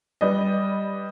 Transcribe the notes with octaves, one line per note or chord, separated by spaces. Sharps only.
G3 B4 D5 D#5